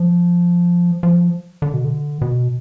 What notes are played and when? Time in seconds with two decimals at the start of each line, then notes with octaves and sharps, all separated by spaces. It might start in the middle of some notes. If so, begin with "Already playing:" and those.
Already playing: F3
1.03 F3
1.62 D3
1.74 B2
1.85 D3
2.22 B2